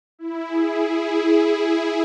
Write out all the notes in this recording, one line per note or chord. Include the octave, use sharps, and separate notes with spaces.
E4
G#4
G#4
E4